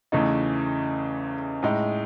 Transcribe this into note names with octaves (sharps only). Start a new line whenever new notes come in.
E2 C#3 E3 A3 D#4
A2 G#3 D#4